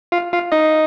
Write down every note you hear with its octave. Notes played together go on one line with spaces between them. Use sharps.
F4 F5
F4 F5
D#4 D#5